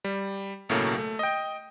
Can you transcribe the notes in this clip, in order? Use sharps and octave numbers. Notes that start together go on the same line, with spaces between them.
G3
B1 A2 C#3 F#3 A3 A#3
A3
D#5 G5